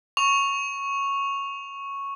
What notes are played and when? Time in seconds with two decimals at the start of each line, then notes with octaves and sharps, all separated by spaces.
0.17 C#6 F7